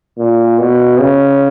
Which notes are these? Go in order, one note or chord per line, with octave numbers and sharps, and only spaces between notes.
A#2
B2
C#3